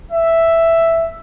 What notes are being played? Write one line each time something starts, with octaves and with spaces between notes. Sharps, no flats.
E5